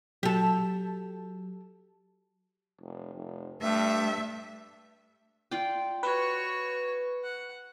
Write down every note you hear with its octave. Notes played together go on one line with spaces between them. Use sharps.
F#3 G4 A4
F1
F1
G2 A3 E5
F4 D5 G5
F#4 B4 C#5
F#5